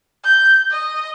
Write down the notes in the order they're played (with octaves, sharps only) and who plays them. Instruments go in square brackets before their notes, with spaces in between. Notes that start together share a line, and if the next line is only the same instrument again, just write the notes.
[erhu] G6
D#5